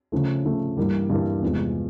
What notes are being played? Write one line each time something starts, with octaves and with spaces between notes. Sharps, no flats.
C#3 F3 A3
C#3 F3 A3
G2 E3 G3 A#3
G2 E3 G3 A#3
E2 C3 F3 G#3